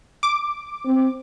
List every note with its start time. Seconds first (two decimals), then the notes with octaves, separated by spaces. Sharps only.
0.23 D6
0.85 C4